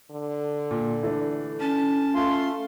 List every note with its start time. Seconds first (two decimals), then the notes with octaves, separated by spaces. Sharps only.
0.11 D3
0.71 A#2
1.03 E3 A3 D4
1.60 C#4 A5
2.15 A3 F4 C6